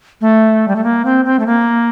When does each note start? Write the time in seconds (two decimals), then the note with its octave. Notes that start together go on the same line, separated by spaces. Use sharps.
0.21 A3
0.68 G3
0.76 A3
0.84 A#3
1.05 C4
1.25 C4
1.39 A3
1.46 A#3